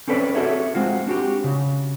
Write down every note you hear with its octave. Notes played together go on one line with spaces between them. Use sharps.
C4 C#4 A4 B4 C5 D5
F#4 G#4 A4 C#5 E5
G#3 C4 F4 F#4
D4 F#4 G4
C#3